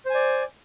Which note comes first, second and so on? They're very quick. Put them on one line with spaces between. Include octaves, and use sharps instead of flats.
C5 G#5 D5